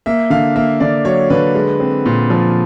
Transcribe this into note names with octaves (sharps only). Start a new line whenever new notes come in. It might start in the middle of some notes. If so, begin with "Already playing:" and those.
A#3 E5
D3 F5
A#3 E5
D3 D5
F#3 C#5
D3 B4
G#3
C4
A#2
F3